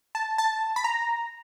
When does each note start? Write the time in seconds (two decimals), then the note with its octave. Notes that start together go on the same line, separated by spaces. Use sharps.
0.15 A5
0.38 A5
0.76 B5
0.84 A#5